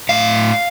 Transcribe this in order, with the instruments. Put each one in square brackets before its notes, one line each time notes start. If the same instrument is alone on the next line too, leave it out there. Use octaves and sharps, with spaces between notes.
[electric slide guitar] A2 F5